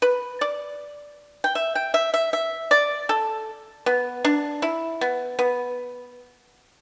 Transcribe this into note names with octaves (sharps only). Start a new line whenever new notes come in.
B4
D5
G5
E5
G5
E5
E5
E5
D5
A4
B3
D4
E4
B3
B3